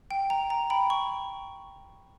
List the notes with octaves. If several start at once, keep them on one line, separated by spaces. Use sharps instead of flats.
G5
G5 A#5
A#5
G5 B5
C#6